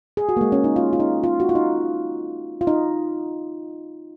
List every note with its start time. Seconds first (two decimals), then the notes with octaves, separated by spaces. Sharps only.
0.17 G#4
0.29 F#4
0.37 A#3
0.41 G#3
0.52 C#4
0.64 D#4
0.76 F4
0.93 F4
1.00 D#4
1.24 F4
1.40 F#4
1.49 F4
1.55 D#4
2.61 F4
2.67 D#4